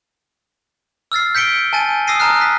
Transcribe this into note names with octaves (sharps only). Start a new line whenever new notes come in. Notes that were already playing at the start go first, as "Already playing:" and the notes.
E6 F6 A6 C7
G6 B6 C#7 D7 G7
G#5 A5 G6 A6 D#7
D#6 E6 A#6 C7 D#7
A5 A#5 D#6 F6 F#6 C7
B6